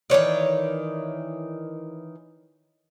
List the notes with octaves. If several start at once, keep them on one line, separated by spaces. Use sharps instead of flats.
D#3 E3 C#5 D5